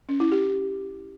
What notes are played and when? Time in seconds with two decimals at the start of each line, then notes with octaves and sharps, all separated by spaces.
0.09 C#4
0.20 E4
0.32 G4